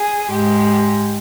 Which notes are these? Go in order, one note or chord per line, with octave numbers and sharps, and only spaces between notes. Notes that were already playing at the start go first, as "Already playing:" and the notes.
Already playing: G#4
G#2 G#3 G4